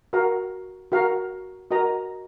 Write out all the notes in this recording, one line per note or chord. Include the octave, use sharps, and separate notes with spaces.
F#4 A#4 F5 A#5
F#4 A#4 F5 A#5
F#4 A#4 D#5 A#5